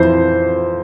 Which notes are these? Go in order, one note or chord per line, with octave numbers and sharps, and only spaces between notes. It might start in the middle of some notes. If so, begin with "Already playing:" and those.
Already playing: F2 E3 C5